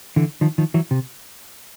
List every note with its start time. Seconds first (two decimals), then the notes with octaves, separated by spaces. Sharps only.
0.16 D3 E3
0.41 D#3 F3
0.58 D#3 F3
0.74 E3 F#3
0.91 C3